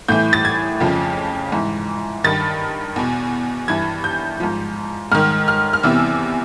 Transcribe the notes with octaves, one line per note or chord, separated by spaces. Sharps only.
A2 E3 G6
A6
G#6
F2 C#3 F3
G#2 E3
G2 D#3 A6
E2 B2
G2 E3 G#6
G6
G#2 F3
G#2 D#3 F6
F6
F6
E2 C3 E3 E6